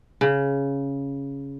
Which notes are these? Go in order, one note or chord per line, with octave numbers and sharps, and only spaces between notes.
C#3